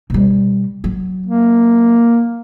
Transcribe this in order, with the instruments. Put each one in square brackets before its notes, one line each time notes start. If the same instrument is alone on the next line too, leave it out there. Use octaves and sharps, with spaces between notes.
[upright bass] B2 G3
F#3
[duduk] A#3